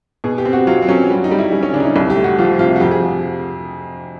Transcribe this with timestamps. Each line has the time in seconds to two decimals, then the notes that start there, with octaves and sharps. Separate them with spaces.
0.24 B2 G#4
0.38 G4
0.45 C4
0.53 F#4
0.67 F#3 F4
0.82 C4
0.88 F#3 C#4
1.10 G3
1.24 D#4
1.31 G3
1.39 E4
1.52 G3 C#4
1.63 C#4
1.73 C#3 D4
1.80 D#4
1.84 E4
1.96 C2
2.10 G4
2.16 A3
2.24 F#4
2.39 F3 F4
2.59 C3 F4
2.76 F#4
2.80 F2 G4
2.91 G#4